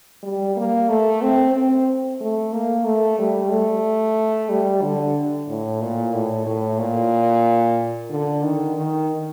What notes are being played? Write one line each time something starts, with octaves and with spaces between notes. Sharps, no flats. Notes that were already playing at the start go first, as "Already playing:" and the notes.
G3
A#3
A3
C4
C4
A3
A#3
A3
G3
A3
G3
D3
A2
A#2
A2
A2
A#2
D3
D#3
D#3